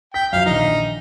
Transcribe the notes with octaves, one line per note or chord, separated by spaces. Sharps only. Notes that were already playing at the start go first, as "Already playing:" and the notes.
G5 B6
F#2 F3 F5
A#1 D#3 E3 D#4